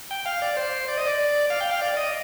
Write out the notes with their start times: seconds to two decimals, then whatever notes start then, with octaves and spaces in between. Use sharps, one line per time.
0.11 G5
0.26 F5
0.42 D5
0.57 C5
0.88 D5
0.98 D#5
1.07 D5
1.50 F5
1.61 G5
1.71 F5
1.81 D5
1.97 D#5